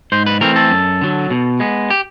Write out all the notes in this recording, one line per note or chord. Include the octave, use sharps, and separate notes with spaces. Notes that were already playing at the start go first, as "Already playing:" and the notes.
G#2 C5
B4
E3 A3 C4 A#4
A4
F#2
D3 F#3
B2
G#3 B3
G4